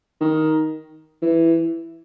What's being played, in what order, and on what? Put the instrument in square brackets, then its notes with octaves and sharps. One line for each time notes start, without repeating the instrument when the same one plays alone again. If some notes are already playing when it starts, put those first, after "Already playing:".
[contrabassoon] D#3
E3